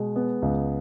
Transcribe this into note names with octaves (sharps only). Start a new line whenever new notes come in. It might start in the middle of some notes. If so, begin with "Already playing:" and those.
Already playing: B2 G#3
B3
C#2